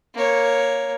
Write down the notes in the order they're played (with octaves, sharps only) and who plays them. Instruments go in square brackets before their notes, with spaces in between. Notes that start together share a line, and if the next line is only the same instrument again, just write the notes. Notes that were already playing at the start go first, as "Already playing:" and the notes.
[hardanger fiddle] A#3 C#5